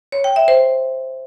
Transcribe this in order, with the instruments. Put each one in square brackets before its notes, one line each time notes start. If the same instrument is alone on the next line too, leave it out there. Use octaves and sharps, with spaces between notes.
[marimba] C#5
G5
E5
C5